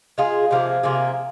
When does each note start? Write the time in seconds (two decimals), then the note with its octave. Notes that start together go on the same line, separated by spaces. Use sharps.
0.18 G#3 F4 G#4
0.51 C3 F3 A#3 G#4
0.83 C3 F3 A#3 G#4